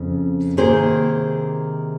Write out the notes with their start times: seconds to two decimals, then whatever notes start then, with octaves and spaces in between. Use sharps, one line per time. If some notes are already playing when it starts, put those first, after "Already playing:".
Already playing: F2 C#3
0.57 C3 D#3 A#3 G#4 C5